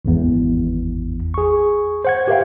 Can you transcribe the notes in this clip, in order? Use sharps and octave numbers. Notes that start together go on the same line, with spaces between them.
G#1 E2
G#4 C#6
C5 F#5 G#6
G4 A#4 B4 E5 F5 G5